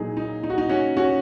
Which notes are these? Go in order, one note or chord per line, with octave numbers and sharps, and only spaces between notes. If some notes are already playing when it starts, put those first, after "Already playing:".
Already playing: A#2 F#3 D#4 G#4
D#4
D#4
F#4
D#4
C#4 F#4
C#4 F#4